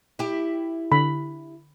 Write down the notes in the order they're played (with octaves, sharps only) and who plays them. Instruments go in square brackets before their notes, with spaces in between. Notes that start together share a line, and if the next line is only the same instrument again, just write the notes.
[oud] E4 G4
[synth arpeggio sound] D3 [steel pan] B5